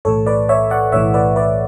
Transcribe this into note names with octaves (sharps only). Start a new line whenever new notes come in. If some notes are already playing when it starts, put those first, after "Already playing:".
B1 A2 E3 A4 C#5
B4 D5
C#5 E5
D5 F#5
B1 A2 E3 C#5 E5
B4 D5
B4 D5